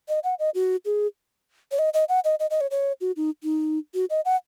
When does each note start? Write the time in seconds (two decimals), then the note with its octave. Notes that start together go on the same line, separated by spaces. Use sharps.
0.09 D#5
0.24 F#5
0.39 D#5
0.55 F#4
0.85 G#4
1.72 C#5
1.79 D#5
1.94 D#5
2.09 F#5
2.24 D#5
2.40 D#5
2.50 D#5
2.61 C#5
2.71 C#5
3.01 F#4
3.17 D#4
3.43 D#4
3.94 F#4
4.10 D#5
4.25 F#5